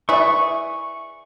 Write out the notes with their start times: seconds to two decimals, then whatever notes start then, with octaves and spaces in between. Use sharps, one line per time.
0.09 E4 G#4 B4 D5 E5 C#6